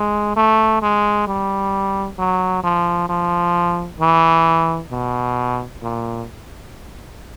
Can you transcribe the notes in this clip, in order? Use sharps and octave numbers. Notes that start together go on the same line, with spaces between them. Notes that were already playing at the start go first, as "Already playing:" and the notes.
Already playing: G#3
A3
G#3
G3
F#3
F3
F3
E3
B2
A#2